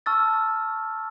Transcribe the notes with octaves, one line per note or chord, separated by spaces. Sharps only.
A5 C#6 E6 F6 A6